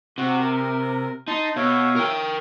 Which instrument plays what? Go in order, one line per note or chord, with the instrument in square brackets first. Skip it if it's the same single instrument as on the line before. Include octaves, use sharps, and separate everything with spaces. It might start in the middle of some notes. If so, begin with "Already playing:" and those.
[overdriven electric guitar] C3 [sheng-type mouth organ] F#4
[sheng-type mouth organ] A#4
[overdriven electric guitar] D#4 [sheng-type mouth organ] A5 C6
[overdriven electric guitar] B2 [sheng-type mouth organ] C#5 E5 F5
[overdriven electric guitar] A#4 G5